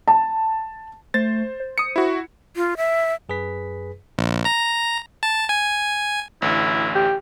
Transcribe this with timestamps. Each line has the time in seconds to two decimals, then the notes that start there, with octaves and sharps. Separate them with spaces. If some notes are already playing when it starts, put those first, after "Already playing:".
0.08 A5
1.14 A3 C5 A6
1.60 C5
1.78 D#6 C#7
1.96 E4 F#4
2.56 F4
2.77 E5
3.29 F#2 G#4 B4 B6
4.18 A#1
4.45 A#5
5.23 A5
5.49 G#5
6.42 A1 D2 E4
6.95 G4